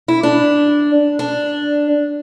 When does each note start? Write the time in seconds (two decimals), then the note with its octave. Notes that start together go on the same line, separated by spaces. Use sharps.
0.08 E4
0.23 D4
1.19 D4